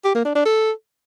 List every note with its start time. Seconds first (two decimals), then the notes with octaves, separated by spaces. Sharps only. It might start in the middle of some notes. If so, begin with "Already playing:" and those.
0.05 G4
0.15 A#3
0.25 D4
0.35 D4
0.46 A4